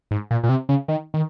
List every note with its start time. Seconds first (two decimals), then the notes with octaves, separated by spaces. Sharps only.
0.11 G#2
0.31 A#2
0.43 A#2
0.49 C3
0.69 C#3
0.88 D#3
1.14 D#3